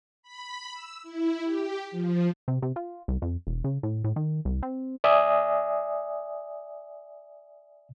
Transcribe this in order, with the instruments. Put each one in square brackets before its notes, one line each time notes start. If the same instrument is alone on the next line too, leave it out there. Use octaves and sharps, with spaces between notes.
[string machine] B5
E6
E4
G4
F3
[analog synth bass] C3
C3
F4
C2
F2
E1
C#3
A2
A2
D#3
C2
C4
[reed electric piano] D5 E5 G#5 D#6